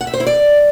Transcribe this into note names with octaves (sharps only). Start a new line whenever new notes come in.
F#5
E5
C5
E4
D5